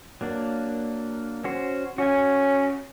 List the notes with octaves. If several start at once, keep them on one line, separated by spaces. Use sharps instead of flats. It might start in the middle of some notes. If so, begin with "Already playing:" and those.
F#3 A#3 D4
C#4 F#4 C5
C#4 F#4 G#5